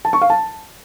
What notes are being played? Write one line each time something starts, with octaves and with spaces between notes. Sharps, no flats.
A5
C#6
F5
A5